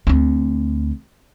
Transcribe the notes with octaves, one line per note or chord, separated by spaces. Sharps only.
D2 C4